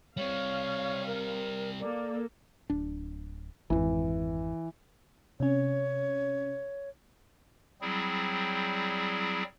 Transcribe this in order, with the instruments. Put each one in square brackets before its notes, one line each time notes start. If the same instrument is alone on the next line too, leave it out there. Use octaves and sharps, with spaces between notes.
[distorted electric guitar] G3 C4 [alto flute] C#5 [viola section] F5
[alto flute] A#4
[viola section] A#3 A4 [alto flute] D5
[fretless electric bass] D1 D4
[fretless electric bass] G#1 F2 [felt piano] E3
[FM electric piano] C3 C#4 [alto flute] C#5
[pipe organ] F#3 G3 C4 E4 G#4